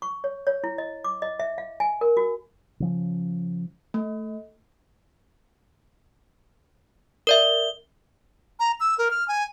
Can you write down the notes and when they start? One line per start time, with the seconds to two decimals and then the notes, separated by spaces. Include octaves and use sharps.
0.02 C#6
0.24 C#5
0.47 C#5
0.64 E4
0.78 D#5
1.04 D6
1.22 D#5
1.40 E5
1.58 F5
1.80 G#5
2.01 A#4
2.17 F#4
2.80 C#3 F3 C#4
3.94 A3
7.27 A#4 D5 E5 G7
8.59 A#5
8.80 E6
8.98 A#4
9.11 F6
9.28 G#5